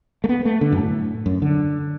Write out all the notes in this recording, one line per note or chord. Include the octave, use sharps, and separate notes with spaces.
A3
B3
A3
D3
F#2
A2
F#2
D3